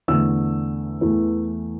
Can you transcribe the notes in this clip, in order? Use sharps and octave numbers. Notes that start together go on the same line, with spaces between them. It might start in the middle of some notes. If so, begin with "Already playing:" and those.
E2 D3 A3 E6
E2 E3 A3